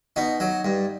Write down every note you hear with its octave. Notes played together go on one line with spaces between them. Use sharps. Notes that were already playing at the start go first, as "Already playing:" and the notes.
B2 D#4
F#3
G2